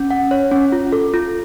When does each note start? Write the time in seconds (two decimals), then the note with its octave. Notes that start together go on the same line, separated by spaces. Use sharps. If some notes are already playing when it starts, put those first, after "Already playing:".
Already playing: C#4
0.10 F#5
0.31 C#5
0.51 C#4
0.72 F4
0.92 A4
1.14 F4